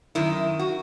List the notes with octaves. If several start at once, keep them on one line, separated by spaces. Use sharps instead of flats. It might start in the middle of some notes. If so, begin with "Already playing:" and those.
F#2 D#3 E4
F#4